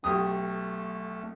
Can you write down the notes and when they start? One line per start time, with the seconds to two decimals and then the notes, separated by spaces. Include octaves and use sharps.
0.04 B1 A3 G4 D#6